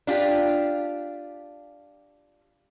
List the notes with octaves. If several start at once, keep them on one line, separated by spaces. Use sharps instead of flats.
D4 F4 G4